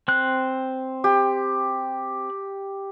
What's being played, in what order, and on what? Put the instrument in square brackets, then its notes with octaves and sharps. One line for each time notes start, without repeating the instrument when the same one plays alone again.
[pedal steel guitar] C4 F#6
[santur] G4